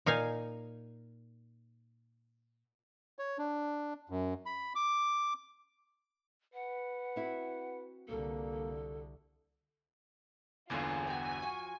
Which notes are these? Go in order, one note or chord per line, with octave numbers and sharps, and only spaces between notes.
A#2 D#4 F5 G#5
C#5
D4
F#2
B5
D6
B4 F#5
C4 E4 F#4
C2 D3 A#3 A4
G1 E2 D3 A#3 C#4 F4 G#4
F#4 G5 G#5
F3 F#4